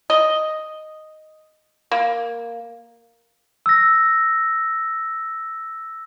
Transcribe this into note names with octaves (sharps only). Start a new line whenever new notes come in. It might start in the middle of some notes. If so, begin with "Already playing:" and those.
D#5
A#3
E6 A#6